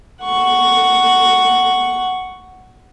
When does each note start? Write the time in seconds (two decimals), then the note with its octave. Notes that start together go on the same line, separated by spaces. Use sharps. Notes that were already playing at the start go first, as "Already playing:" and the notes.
0.24 F#5 C#6